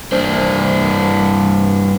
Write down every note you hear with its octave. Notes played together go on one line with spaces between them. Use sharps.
G2 D4 C5